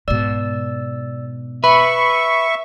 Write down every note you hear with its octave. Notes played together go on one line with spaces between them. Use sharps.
G#2 B2 D5 E6
B4 E5 B5 C#6